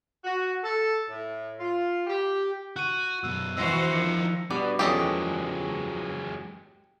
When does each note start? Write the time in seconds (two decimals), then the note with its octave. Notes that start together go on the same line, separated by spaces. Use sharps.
0.24 F#4
0.64 A4
1.09 A2
1.60 F4
2.07 G4
2.76 F#4 F#6 D#7
3.23 F#2 B2 E6
3.57 E3 E4 F#4 C5 D#5 E6 A#6 F7
3.90 D#3 F3 C#7
4.51 G2 B2 B3 D5
4.79 E2 F3 F#3 G#3 C#4 G4 A4 D#5